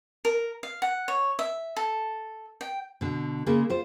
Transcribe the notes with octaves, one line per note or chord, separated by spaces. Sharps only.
A#4
F5
F#5
C#5
E5
A4
G5
B2 D3
C#3 G#3 A#3
F4 C5